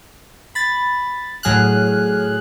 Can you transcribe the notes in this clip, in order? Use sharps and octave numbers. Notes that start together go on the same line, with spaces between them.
B5 A6
A2 F#3 G#4 F6 F#6